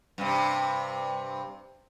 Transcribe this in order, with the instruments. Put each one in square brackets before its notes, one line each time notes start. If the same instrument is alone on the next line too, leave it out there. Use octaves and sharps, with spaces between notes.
[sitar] G2 C3